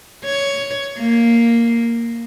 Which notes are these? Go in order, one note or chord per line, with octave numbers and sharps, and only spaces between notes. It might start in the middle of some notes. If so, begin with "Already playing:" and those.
C#5
A#3